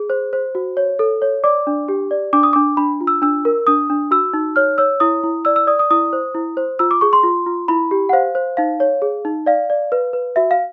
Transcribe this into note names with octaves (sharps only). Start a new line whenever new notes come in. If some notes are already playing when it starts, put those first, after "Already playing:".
Already playing: G#4
C5
C5
F#4
C#5
A4
C#5
D5 D6
D4
G4
D5
D4 D6
D#6
D4 D6
D4 B5
F4
E6
D4 E6
A#4
D4 D#6
D4
F#4 E6
D#4
C#5 F6
C#5 E6
E4 D#6
E4
D5 E6
E6
D5 D#6
D#6
E4 D#6
C5
E4
C5
F4 E6
D6
G#4 C#6
C6
F4
F4
E4 B5
G4
F#5
C5 F5
C5
D#4 F5
C#5
G#4
D#4
D5 F5
D5
B4
B4
F#4 E5
F5